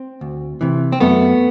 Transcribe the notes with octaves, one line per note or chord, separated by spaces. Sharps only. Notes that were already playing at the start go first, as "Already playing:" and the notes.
Already playing: C4
D2
C3 E3
C4
F#2 A3 B3